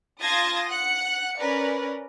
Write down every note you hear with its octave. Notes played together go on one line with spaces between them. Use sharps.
F4 A5 C6 D#6 G#6 A#6
F#5 F#6 C#7
C#4 A#4 B4 D5